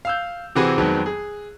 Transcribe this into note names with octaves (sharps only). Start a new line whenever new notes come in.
F5 E6 G6
C3 E3 C4 F#4 G#4 B4
F2 D#3 F#3 G#3 B3 C4
G#4